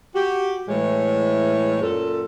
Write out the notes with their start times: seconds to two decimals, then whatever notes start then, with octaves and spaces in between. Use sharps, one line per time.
0.15 F#4 G4
0.68 A2 E3 G#3 C#5
1.81 F#2 A#2 A4